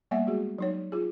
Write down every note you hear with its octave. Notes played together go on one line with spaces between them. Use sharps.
G3 A#3 B3 D5 E5 F#5
G#3 F#4 G#4
F#3 D#4 C#5
F4 G#4